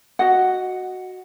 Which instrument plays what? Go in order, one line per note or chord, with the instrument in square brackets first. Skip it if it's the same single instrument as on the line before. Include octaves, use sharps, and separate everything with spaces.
[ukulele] F#4 D#5 F#5